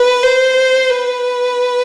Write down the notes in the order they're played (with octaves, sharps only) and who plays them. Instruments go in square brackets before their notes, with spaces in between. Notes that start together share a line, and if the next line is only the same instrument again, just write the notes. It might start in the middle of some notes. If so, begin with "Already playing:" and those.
Already playing: [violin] B4
C5
B4